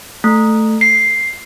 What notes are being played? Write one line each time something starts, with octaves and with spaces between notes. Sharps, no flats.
A3
C7